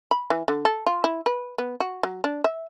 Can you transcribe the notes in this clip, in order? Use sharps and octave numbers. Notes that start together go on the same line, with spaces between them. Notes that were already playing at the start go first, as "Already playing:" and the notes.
B5
E3
D3
A4
F4
E4
B4
B3
F#4
F#3
D4
E5